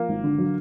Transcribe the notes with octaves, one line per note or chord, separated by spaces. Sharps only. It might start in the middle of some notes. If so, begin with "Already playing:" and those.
Already playing: F3 A#3
G#1
D3
F#3